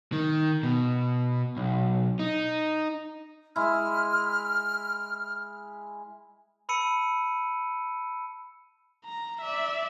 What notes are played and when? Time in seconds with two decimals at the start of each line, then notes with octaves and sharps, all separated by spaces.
0.12 D#3
0.63 B2
1.57 B1
2.19 D#4
3.56 G#3 E4 F6
6.69 A5 B5 E6 C#7 D#7
9.05 A#5
9.42 D5 E5